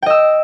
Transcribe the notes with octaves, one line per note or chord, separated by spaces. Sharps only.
D#5 G5 E6